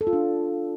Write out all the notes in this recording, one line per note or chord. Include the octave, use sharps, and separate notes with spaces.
A4
F4
D4